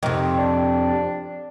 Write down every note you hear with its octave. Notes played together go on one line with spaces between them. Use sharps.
F2 C3 D#3
D4